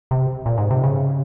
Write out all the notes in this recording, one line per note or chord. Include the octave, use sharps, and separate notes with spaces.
C3
A#2
G#2
C3
C#3